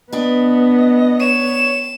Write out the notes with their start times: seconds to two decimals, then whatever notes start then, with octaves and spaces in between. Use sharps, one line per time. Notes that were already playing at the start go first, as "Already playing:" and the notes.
0.13 B3 D4 B4 D#5
1.20 C#5 E7